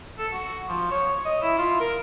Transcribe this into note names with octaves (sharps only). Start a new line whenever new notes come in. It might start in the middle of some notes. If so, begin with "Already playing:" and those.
A4
F#4
F3
C#5
D#5
E4
F4
A#4